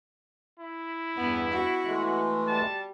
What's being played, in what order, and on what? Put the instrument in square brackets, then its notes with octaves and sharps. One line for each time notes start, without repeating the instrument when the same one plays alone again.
[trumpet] E4
[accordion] E2 G2 [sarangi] B3
[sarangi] F#4
[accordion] E3 G#3 A3
[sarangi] G3 [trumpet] A5